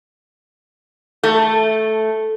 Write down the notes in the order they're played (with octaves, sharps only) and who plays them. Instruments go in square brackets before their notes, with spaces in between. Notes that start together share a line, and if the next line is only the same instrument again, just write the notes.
[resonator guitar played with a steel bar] A3